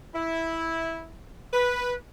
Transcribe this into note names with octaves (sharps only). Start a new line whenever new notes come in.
E4
B4